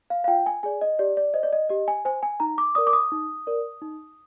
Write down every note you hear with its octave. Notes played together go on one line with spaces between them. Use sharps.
F5
F5
F4 G5
G#5
G#4 D5 G#5
D#5
G4 D5
D5
C5 D#5
D5
D#5
G4 D#5
G#5
C5 G#5
G#5
D#4 A#5
D6
A#4 D5 D#6
D6
D#6
D#4
A#4 D5
D#4